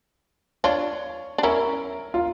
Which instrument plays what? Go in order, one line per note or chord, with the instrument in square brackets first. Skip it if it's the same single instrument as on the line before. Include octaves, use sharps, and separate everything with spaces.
[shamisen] D4 F4 [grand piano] C#5
[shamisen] D4
[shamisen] C#4 E4 [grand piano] A#4
[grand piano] F4